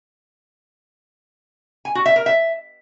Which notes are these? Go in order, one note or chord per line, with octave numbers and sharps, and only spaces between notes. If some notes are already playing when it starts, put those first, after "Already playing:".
G#5
F#4
E5
A#4
E5